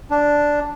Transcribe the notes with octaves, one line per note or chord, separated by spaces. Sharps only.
D4